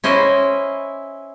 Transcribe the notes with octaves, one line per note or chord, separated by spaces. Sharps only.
C#4 E4 C5 D#5